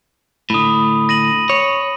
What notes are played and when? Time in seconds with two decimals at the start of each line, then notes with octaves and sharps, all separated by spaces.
0.50 A2 D3 B5 D#6
1.09 A#6 D#7 F#7
1.50 C#5